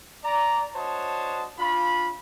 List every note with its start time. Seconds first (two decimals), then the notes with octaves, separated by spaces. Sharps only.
0.24 D5 A#5
0.75 D4 F#4 C5 C#5 D#5 A5
1.58 D4 F4 B5